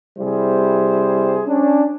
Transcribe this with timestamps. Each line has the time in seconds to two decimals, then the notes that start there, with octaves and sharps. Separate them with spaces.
0.19 C3 G3 E4 G#4 C5
1.47 C#4 D4